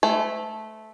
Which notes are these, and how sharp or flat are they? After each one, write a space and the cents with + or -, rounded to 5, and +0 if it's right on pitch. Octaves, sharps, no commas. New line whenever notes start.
A3 -10 C5 -45